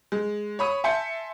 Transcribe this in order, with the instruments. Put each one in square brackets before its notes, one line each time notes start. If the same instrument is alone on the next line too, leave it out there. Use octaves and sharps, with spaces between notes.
[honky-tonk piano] G#3
C#5 B5 D#6
E5 G#5 A5 C6 G6 C#7